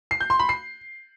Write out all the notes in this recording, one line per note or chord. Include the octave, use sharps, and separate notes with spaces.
C7
G6
C6
B5
C7